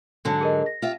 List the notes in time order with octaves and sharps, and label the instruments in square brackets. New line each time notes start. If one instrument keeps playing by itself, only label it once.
[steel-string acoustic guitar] G#2 D3 F#3
[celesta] G#4 A#4 D#5
A#6
[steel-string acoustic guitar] F4 G4 E5